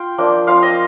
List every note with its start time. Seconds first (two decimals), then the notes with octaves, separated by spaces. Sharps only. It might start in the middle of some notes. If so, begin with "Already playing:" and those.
Already playing: F4 F5 G5
0.18 F3 A#3 D4
0.47 F3 C4 F4 F5
0.63 D#5